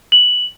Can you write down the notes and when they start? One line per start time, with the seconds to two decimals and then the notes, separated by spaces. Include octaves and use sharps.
0.12 F#7